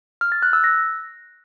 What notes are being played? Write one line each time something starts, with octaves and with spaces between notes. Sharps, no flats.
F6
A6
F#6
E6
A#6